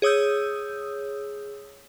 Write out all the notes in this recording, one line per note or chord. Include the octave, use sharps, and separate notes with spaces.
G#4 C#5 D#6 E6 G6